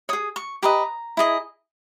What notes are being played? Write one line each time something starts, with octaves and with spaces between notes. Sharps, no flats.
G#4 C#5 D#6
C#6
G4 B4 D#5 A#5
E4 G#4 D#5